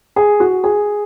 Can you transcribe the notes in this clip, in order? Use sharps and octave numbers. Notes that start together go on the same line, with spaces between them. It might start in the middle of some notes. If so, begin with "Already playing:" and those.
G#4
F#4
G#4